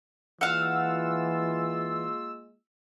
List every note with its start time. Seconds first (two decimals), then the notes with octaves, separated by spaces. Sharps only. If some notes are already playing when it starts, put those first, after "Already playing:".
0.41 E3 G#3 A#3 F4 F5 F#5 E6